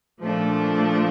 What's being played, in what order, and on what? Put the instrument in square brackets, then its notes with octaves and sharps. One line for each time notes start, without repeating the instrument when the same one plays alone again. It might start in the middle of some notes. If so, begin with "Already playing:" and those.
[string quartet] A#2 F3 A3 D4